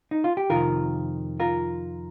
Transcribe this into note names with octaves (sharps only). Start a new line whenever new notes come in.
D#4
F4
G4
F2 C3 D#3 F4 A#4
F4 A#4